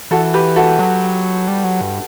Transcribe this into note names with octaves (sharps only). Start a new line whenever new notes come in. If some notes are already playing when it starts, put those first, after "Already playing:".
E3 F#4 A4
G4 B4
F#4 A4
F#3
G3
F#3
G2